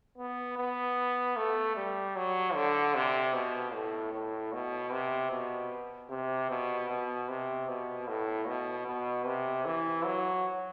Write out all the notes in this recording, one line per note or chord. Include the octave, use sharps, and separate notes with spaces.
B3
B3
A3
G3
F#3
D3
C3
B2
A2
A2
B2
C3
B2
C3
B2
B2
C3
B2
A2
B2
B2
C3
E3
F#3